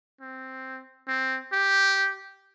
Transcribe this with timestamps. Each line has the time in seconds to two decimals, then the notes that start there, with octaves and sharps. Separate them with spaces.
0.20 C4
1.08 C4
1.53 G4